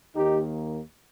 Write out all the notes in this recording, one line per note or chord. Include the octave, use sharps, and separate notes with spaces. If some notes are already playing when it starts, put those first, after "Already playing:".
D#2 D#3 A#3 D#4 G4